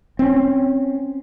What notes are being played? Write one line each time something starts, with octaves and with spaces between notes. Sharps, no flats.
C4 C#4